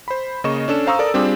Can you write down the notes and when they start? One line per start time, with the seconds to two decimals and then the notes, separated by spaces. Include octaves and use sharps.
0.08 C5 B5
0.44 C#3 A#3 D#5 C#6 E7
0.68 C#4 D4 A4 E7
0.87 C5 F5 A#5 C#6 D#6 E6
0.99 A4 A#4 D5 A#5
1.14 G3 C4 D4 F4 G4 G#4